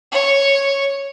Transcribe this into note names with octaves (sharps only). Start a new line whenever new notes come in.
C#5